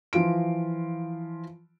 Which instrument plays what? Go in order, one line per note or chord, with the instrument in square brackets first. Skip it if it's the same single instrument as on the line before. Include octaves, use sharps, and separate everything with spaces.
[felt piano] E3 F3 F4 D7